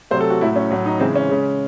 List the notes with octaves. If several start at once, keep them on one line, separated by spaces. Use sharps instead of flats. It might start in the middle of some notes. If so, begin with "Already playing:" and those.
C3 F#3 A3 C5
A4
F#4
A2 F#3 A3 E4
C#4
A2 F#3 A3
D#4
C#3 E3 G#3 C4
C#4
C#3 G#3